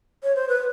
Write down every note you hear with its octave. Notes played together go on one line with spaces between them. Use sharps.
C#5
C5
B4